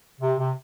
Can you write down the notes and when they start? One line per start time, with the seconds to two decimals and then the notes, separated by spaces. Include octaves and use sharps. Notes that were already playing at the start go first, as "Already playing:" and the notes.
0.20 C3
0.38 C3